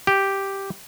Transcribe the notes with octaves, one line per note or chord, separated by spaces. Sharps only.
G4